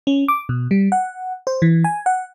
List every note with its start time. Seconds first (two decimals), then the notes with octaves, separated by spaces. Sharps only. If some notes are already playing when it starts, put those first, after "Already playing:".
0.07 C#4
0.28 D6
0.49 B2
0.71 G3
0.92 F#5
1.47 C5
1.62 E3
1.84 G#5
2.06 F#5